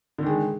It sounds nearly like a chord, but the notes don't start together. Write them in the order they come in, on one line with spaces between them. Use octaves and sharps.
D3 D#3 G#3